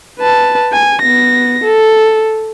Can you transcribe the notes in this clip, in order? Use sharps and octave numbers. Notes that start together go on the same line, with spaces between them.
B4 A5
G#5
B3 A#6
A4